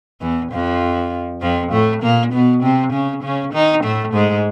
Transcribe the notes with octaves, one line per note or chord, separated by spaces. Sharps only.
E2 E3
F2 F3
F2 F3
A2 A3
A#2 A#3
B2 B3
C3 C4
C#3 C#4
C#3 C#4
D#3 D#4
A2 A3
G#2 G#3